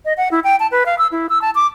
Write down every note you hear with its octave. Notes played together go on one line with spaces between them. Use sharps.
D#5
F#5
E4
G5
A5
B4
F5
E6
E4
E6
A5
D6